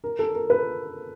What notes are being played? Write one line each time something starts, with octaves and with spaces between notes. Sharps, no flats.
A#4
A4
A#4
B4